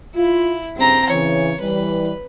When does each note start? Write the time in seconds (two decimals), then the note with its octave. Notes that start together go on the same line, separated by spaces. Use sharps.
0.16 E4 F4
0.77 G2 C#3 C4 A#5
1.10 C#3 E3 C#5
1.61 E3 G3 B4